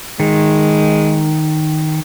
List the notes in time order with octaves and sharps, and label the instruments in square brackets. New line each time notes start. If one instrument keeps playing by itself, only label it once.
[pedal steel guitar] D#3 [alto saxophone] G#3